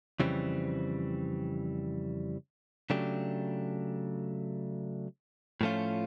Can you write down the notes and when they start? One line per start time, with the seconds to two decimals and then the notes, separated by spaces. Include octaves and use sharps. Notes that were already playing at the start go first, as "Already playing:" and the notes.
0.19 F2 C#3 E3 G3 C4
2.90 C#3 F#3 A3 D4 G4
5.61 A2 F3 A3 C#4 F4